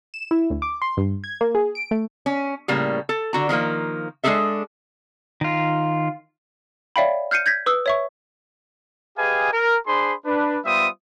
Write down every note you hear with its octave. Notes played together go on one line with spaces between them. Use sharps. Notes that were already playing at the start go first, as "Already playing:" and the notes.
E7
E4
D2
D6
C6
G2
G#6
A#3
G#4
D7
A3
C#4
A2 C#3 G3 A#3
A4
D3 F#4 A#5
D#3 F3 G3 A#3
G#3 D4 D#4 G#4 A4 E5
D#3 F4
C#5 D5 E5 F5 G5 B5
F6 G6 C7 C#7 D#7
G6 G#6 A#6 B6
B4 D#6 E6
C#5 E5 C#6
G4 G#4 B4 D#5 F5 G#5
A#4
D4 G#4 C5 B5 C6
D4 B4
G3 B3 F4 C5 E5 D#6